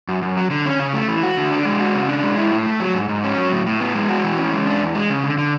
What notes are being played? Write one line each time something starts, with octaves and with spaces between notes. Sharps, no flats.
F#2
F#2
F#3
D3
C#4
C#3
A3
E3
F#4
D3
D4
G#3
F#4
C#3
D4
G#3
E4
A2
A3
F#3
G#2
G#2
C#4
F#3
A2
A2
B3
G#3
F#4
E3
C#4
G#3
D4
E2
G#3
C#3
D3
D3